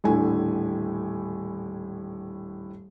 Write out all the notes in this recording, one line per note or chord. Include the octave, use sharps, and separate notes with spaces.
D#1 A2 D3 E4 G#5